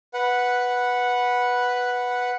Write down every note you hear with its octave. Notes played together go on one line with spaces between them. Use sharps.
B4 F#5